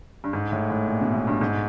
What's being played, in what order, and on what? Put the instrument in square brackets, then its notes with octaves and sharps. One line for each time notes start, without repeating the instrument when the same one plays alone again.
[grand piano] G2
G#2
A2
A2
A#2
B2
A2
G2
G#2